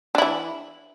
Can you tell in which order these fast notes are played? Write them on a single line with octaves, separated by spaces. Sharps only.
D4 E4 E3